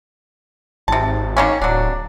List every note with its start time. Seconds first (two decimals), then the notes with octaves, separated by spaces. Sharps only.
0.88 G#1 C3 A5
1.37 D#3 A#3 C#4
1.62 D1 F#3 D4